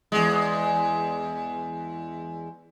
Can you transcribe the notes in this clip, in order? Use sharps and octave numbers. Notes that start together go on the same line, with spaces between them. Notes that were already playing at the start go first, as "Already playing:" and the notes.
E2 G#3